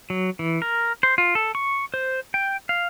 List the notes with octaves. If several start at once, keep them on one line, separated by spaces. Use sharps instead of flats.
F#3
E3
A#4
C5
F4
A4
C#6
C5
G5
F5